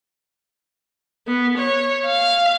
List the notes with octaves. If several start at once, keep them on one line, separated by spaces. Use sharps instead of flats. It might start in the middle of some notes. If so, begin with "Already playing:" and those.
B3
C#5
F5